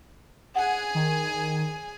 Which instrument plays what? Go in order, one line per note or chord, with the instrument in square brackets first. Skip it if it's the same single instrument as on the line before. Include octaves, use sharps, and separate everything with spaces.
[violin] G#4 G#5 [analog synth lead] F#5
[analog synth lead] D#3